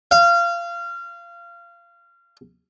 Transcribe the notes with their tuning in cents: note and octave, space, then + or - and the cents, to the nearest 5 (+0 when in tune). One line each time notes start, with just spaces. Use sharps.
F5 -25